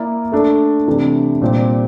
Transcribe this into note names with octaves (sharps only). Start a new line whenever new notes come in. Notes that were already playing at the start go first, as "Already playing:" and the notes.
Already playing: A#3 E4 A#4 D5
A3 D4 A4
C3 E3 A3 D4
A#2 G3 C4 G4